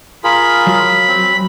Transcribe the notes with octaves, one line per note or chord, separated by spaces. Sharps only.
F4 G#4 A#4 B5
F#3
C4